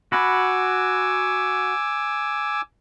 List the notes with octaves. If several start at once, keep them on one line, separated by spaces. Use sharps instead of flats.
F#4 G#5 B5 D6 E6